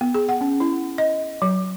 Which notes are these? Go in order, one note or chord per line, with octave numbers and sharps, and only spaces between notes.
B3
G#4
F#5
C#4
E4
D#5
F#3